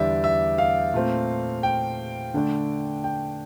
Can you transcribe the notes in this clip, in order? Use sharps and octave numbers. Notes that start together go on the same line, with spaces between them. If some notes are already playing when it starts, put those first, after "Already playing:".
Already playing: E2 D3 G3 D5 E5
E5
F5
A#2 A3 C4
G5
D3 A3 D4
G5